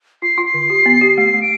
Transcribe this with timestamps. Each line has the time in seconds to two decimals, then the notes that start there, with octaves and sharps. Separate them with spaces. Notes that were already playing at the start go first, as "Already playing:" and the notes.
0.22 F4 C7
0.38 F4
0.46 C7
0.54 D3
0.70 G4
0.86 B3
1.01 G4
1.18 A3 C7
1.34 A3
1.42 D7